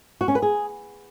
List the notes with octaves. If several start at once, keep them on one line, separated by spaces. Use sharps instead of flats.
F#4
C#4
B4
G#4